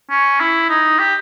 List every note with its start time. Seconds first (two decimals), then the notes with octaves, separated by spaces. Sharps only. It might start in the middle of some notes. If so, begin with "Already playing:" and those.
0.10 C#4
0.40 E4
0.70 D#4
0.99 G4